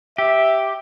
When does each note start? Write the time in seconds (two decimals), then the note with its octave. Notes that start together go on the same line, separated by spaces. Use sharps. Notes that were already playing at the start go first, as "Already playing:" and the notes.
0.18 G4 E5